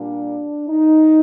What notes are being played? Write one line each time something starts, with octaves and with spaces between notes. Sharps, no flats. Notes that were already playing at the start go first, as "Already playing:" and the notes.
Already playing: A#2 G3 A#3 D4
D#4